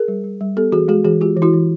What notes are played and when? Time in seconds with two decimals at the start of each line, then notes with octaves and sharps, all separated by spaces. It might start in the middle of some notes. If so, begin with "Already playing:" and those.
Already playing: G#4 A#4
0.08 G3
0.24 G3
0.41 G3
0.57 B3 G4 A4
0.72 E3 F#4 G#4
0.88 G#3 F#4 G#4
1.05 E3 F#4 G#4
1.21 G#3 F4 G4
1.37 E3
1.42 E4 F#4
1.53 E3